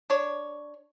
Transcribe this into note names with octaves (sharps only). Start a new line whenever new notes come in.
D4 C#5